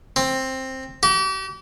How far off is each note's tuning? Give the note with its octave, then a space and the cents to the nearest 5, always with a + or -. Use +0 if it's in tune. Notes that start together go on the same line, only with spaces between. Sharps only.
C4 +10
G4 -40